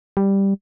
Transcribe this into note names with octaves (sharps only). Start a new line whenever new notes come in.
G3